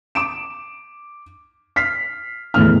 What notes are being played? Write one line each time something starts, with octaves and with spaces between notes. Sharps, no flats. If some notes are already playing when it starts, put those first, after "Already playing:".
D6 D7 E7
F6 B6 C7
E2 A2 F6